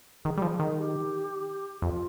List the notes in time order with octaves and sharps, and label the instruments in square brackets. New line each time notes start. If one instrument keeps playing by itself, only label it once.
[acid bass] D#3 [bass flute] G#4
[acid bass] G3
F3
D#3
[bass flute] G4
[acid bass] F2 [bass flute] F4